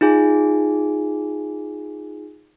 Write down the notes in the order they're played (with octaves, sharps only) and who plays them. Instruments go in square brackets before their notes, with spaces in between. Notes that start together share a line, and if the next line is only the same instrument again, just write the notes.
[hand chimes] D#4 F4 G#4 G#5